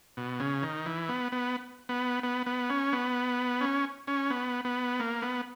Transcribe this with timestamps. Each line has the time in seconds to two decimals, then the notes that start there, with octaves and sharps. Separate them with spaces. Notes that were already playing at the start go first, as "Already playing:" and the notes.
0.17 B2
0.40 C#3
0.63 D#3
0.86 E3
1.09 B3
1.32 B3
1.89 B3
2.23 B3
2.47 B3
2.70 C#4
2.93 B3
3.61 C#4
4.07 C#4
4.30 B3
4.65 B3
5.00 A#3
5.22 B3